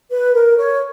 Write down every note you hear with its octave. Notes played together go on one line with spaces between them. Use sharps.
B4
A#4
C#5